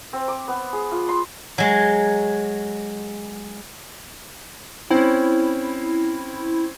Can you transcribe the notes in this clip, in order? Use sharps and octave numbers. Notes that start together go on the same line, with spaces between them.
C4
D6
B3
G#4
F4
C6
F#3 G#3
C4 C#4 E4